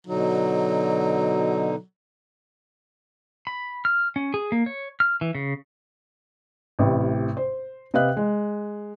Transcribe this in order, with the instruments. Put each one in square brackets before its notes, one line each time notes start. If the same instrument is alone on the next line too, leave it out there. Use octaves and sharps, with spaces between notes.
[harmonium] B2 D3 D#4 [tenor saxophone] F#3
[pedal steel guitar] B5
F6
C#4
G#4
A#3
C#5
F6
E3
C#3
[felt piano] A1 A2 C3
C5
C3 B4 D#5 F5 F#6
G#3